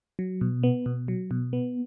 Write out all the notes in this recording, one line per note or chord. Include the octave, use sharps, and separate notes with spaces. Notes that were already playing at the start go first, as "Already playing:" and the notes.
F#3
B2
B3
B2
F#3
B2
B3